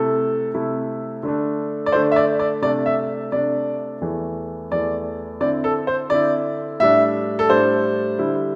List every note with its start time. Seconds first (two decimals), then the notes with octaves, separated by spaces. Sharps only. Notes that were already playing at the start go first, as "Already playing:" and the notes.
Already playing: C3 A3 E4 A4
0.54 C3 A3 E4
1.23 D3 A3 D4
1.86 D5
1.92 D3 A3 D4 C5
2.12 E5
2.16 D5
2.39 D5
2.62 C3 A3 D4 D5
2.86 E5
3.32 C3 A3 D4 D5
4.01 E2 E3 A3
4.71 E2 E3 A3 D5
5.40 D3 C4 E4 D5
5.64 A4
5.87 C5
6.10 D3 C4 E4 D5
6.80 A2 G3 D4 E5
7.39 A4
7.49 A2 G3 D4 C5
8.19 D3 G3 E4